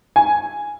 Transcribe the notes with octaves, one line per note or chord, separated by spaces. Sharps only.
G#5